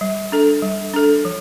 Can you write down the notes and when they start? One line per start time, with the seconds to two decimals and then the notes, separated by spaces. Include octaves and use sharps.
0.01 G3
0.32 D4 A4
0.62 G3
0.94 D4 A4
1.25 F3